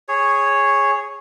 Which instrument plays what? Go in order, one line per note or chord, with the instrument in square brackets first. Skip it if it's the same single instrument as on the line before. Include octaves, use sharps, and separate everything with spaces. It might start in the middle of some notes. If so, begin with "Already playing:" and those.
[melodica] G#4 C#5